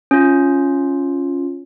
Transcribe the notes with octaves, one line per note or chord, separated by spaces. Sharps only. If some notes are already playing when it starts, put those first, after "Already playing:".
C#4 F4